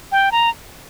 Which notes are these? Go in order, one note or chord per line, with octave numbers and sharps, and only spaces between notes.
G5
A#5